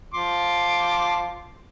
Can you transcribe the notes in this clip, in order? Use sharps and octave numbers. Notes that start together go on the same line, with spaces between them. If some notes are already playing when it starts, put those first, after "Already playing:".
F3 C6 D6